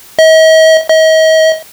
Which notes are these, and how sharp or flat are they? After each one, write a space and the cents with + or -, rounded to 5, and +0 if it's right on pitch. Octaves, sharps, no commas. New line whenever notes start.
D#5 +45
D#5 +40